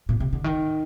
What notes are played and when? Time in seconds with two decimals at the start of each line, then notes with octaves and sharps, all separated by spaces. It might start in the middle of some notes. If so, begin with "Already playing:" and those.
0.09 A#2
0.20 C3
0.33 D3
0.44 D#3